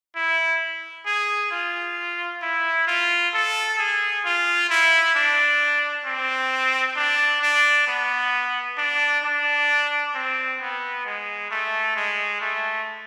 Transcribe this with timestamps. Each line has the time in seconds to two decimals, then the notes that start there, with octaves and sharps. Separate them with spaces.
0.16 E4
1.06 G#4
1.51 F4
2.42 E4
2.88 F4
3.34 A4
3.79 G#4
4.25 F4
4.70 E4
5.15 D4
6.05 C4
6.96 D4
7.42 D4
7.87 B3
8.78 D4
9.24 D4
10.15 C4
10.60 B3
11.05 G#3
11.51 A3
11.96 G#3
12.41 A3